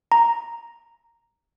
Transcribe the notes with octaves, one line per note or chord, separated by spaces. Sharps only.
A#5